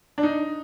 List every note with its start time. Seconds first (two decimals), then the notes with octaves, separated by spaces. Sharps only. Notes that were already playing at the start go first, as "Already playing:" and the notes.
0.18 D4
0.23 D#4